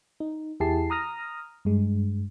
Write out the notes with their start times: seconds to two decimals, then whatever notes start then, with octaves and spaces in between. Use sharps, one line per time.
0.20 D#4
0.60 E2 E4 G4 G#4 A5 C7
0.90 A#5 D#6 F6 A#6
1.65 G2 G#3